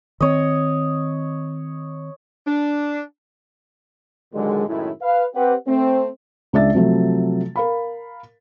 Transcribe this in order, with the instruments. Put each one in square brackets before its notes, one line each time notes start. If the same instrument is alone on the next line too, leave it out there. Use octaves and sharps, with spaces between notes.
[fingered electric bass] D#3 C4 [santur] C#5 D#5
[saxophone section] D4
[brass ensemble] D#2 A#2 D3 D#3 F#3 G#3
F#2 A2 D#3 G#3 E4
B4 F5
C4 G4 B4 F#5
A3 C4
[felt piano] C#2 G#3 D4 D5 E5 A6
C3 F3 F#3 A3
A#4 F5 B5